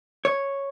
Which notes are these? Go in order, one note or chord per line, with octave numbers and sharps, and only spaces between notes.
C#5